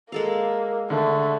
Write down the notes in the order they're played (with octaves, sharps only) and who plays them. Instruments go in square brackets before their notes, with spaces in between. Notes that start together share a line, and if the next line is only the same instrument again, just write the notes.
[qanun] G#3 A4 F5 [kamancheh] A#3
[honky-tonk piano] D3 [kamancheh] A3